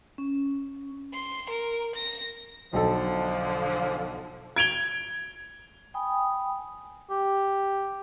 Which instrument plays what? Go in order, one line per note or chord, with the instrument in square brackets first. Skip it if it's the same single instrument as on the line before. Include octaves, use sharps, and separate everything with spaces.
[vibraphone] C#4
[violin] C6
A#4
A#6
[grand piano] B1 F#3 A4 [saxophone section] D3 F3
[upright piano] G#6 D7 F7 G7
[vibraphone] G5 G#5 B5 D#6
[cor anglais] G4